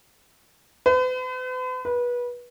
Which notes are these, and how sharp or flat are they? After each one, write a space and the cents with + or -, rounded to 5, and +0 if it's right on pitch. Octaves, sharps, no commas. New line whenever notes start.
B4 +45
B4 -25